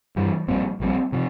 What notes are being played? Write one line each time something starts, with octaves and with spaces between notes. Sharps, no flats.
G2 E3 G3
A#1 A#2 G3 C4
A#1 A#2 G3 C4
C3 F3